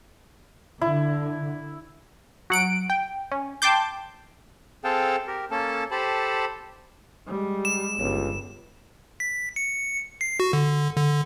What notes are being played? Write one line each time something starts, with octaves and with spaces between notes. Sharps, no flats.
D3 E4
F#3 F#5 D7
G5
C#4
G5 A5 C6 D6 G6
C4 G#4 A4 F5 G5 A5
G4 A#4
A#3 C#4 A4 A5
G4 A4 C5 A5 B5
G3 G#3
E7
G1 C#2 G3
B6
C#7
C7
F#4
D3
D3